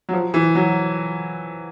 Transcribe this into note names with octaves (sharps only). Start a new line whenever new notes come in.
F#3
F3
E3
F#3